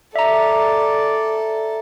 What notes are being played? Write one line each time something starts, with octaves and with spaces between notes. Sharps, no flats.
A4 D5 E5 A#5